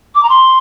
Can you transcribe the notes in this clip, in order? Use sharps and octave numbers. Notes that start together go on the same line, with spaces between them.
D6
A#5
C6